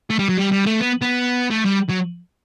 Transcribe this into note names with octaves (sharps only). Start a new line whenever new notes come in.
A3
G3
F#3
G3
G3
A3
B3
B3
A3
G3
F#3